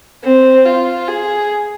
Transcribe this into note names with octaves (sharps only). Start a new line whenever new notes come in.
C4
F4
G#4